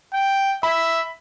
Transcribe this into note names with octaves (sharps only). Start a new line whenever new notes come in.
G5
E5 B5